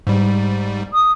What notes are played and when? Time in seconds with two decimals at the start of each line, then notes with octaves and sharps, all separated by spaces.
0.07 G#2 G3
0.93 D#6